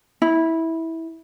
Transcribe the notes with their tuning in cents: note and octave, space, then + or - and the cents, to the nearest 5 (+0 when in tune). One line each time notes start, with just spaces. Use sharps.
E4 -15